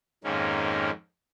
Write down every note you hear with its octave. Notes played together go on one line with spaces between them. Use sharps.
F2 G#2 D#3 A#3 C#4